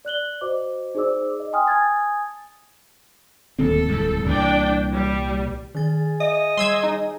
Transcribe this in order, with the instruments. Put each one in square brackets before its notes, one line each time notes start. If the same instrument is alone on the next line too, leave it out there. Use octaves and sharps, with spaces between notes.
[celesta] D5 F#6 F#7 G7
F#4 C5 D#5 D6
D#4 G#4 C5 D5 D6 E6
D#5
G5 G#5 C6 D#6 F6
G#5 A5 D#6 G#6 A6
[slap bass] D1 D#2 C4 [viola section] A4
[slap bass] D1 C2 G#2
[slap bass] C2 A#2 E3 [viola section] D4 G5
[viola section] G3
[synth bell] D#3 A6 [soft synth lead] G#4
[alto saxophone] D#5 [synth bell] E5
[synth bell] G3 [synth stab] C6 E6 G#6
[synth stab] D#4 [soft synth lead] G#4